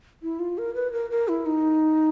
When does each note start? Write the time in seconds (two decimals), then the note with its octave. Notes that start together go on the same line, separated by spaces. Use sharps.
0.23 E4
0.39 F4
0.58 A#4
0.75 B4
0.93 A#4
1.11 A#4
1.28 E4
1.46 D#4